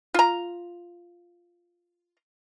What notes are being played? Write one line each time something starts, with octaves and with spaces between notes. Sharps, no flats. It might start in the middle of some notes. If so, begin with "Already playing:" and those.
F4 A#5